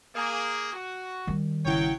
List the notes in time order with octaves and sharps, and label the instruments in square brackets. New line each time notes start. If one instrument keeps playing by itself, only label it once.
[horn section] A#3 G#4
F#4
[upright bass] D#3 G3
[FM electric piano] G#1 C#3 E4 [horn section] F#3 C#5 G5